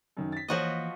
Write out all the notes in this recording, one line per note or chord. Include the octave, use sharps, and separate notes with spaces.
F#2 D#3
A6 B6
E3 F3 A#3 F#4 C5 C#5 D#5